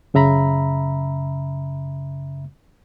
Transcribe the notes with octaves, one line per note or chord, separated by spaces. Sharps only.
F#2 C#3 E5 A#5 B5